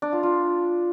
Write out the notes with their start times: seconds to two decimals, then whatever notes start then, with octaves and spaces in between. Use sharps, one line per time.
0.02 D4
0.13 F4
0.23 F4